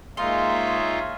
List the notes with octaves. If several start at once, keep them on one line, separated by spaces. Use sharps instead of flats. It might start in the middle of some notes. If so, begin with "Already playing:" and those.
G#3 A#3 D#4 F4 G#4 C#5 E5 C6